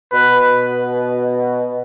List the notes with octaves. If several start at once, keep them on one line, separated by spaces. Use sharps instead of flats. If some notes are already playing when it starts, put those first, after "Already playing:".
B2 B4